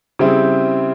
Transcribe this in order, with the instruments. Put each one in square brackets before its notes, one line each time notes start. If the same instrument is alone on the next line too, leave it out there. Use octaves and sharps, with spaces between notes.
[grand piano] C#3 G3 C4 E4 G#4